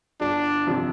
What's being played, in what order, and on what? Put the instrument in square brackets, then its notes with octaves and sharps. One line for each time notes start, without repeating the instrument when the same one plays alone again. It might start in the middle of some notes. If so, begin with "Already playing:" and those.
[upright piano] G1 [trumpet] D4
[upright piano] F2 C3 F3 C4